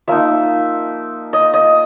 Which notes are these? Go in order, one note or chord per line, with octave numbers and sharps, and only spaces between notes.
F3 A#3 D#4 E5
D#5
D#5